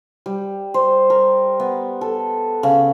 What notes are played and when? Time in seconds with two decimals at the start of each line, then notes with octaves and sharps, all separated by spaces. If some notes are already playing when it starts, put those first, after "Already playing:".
0.26 G3
0.74 C5
1.10 A#4
1.60 B3
2.01 A4
2.63 C#3